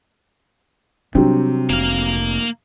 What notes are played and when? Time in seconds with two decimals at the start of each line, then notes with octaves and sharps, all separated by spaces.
1.15 C3 F#3 G3 C4 D4
1.70 F1 A#3 F5